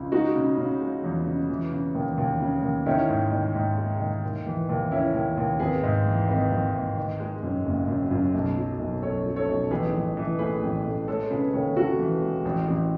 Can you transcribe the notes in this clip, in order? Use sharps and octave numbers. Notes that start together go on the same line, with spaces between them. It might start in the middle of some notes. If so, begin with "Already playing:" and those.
Already playing: C#2
G#3 D#4 F#4
C#3
C#3
G#3
E2
C#3
E3
C#3
D#2
D#2
C#3
D#2
D#3 C#4 E4
G#2
D#3
G#2
G#3
D#3
D#2
E3
D#2
C#3 C#4 E4
D#2
D#2
G#1 G#4 B4
G#2
E3
G#1 B4 D#5
G#1
G#2
D#3
G#3
F#2
F#1
F#2
F#2
B1
F#3
B1
B1 A4 C#5
F#3
A4 C#5
B1
A1 G#4 B4
A1
E3
A2 G#4 B4
A1
A2
G#3 A4 C#5
C#3 G#4 B4
D#2 A4 C#5
C#3 F#4 A4
E3
G#3
A1
A1